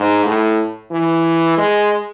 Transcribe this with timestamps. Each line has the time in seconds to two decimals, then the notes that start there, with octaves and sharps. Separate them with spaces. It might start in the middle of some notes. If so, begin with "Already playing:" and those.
Already playing: G#2
0.25 A2
0.91 E3
1.57 G#3